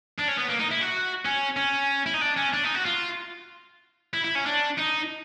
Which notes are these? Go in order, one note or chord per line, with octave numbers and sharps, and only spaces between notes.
D4
C#4
B3
A#3
D#4
E4
F#4
C#4
C#4
E4
D#4
D4
C#4
D4
D#4
F#4
F4
E4
E4
C#4
D4
D#4